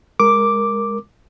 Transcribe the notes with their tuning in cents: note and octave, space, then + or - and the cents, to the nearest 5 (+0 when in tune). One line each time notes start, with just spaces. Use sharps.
G#3 -15 A#4 +0 D6 +0